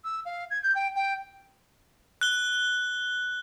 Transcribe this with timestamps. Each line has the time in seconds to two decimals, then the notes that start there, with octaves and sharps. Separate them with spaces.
0.04 E6
0.25 F5
0.50 G#6
0.63 G6
0.75 G5
0.95 G5
2.21 F#6 G7